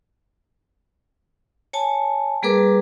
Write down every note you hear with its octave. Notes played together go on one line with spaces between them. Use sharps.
C#5 G#5 A5
G3 A#3 G#4 A#4 B4 D6